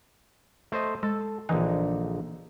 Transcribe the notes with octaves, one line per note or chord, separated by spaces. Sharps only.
A3 C5 D#5
G#3 A4
A#1 D3 E3 D#4